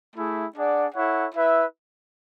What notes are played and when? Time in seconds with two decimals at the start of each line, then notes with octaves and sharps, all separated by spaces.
0.15 A3 E4 G#4
0.55 D4 G#4 D5 F#5
0.95 E4 A4 C#5 F#5
1.34 E4 B4 E5